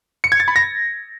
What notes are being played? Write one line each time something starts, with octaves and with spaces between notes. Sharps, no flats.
C#7
G#6
A6
B5
A#6